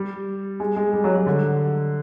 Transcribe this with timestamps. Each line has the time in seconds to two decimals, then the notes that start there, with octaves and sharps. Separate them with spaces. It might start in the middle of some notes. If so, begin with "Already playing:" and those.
Already playing: G3
0.60 G#3
0.76 G#3
0.93 G3
1.04 F#3
1.15 F#3
1.26 D3